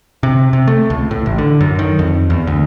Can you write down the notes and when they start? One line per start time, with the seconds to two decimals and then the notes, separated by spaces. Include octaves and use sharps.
0.23 C3
0.53 C3
0.68 A3
0.90 C#2
1.11 A2
1.26 A1
1.38 D3
1.61 F#2
1.79 D#3
1.99 F2
2.30 E2
2.47 D2